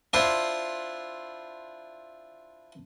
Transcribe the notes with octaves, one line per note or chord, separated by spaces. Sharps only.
D4 E4 F4 C5